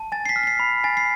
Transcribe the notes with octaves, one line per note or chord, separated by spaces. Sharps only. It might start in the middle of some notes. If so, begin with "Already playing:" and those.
Already playing: A5
G#5 A6
C7
B6
F6
B6
C7
B5
G#5 A6
C7